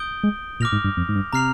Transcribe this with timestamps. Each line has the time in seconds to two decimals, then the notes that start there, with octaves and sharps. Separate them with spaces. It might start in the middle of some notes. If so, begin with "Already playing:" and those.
Already playing: D#6 G6 D7 G7
0.23 G#3
0.60 A#2 D6 F6 A#6 F7
0.72 G#2
0.84 G2
0.97 F2
1.09 G#2
1.15 G2
1.33 C3 A#5 F6 C7 F7